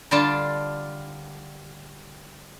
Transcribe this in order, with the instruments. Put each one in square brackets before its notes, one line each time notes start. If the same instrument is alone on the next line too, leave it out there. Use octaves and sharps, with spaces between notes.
[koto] D3 G3 D4 F4 A5